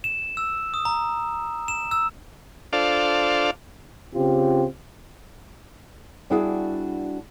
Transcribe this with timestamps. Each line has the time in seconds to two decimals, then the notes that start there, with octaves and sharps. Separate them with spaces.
0.04 E7
0.37 E6
0.74 D#6
0.85 A#5
1.68 E7
1.91 E6
2.73 D4 F4 A4 C5 D5 F5
4.15 C#3 C4 F4 G4
6.30 G3 B3 D4 E4 F#4 G#4